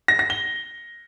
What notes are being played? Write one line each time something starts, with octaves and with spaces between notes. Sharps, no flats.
A#6
A#6
G7